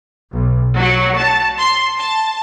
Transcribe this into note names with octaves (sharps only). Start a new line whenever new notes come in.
B1
F#3
A5
C6
A5